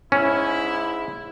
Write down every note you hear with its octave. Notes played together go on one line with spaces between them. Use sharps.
G#2 C#4 E4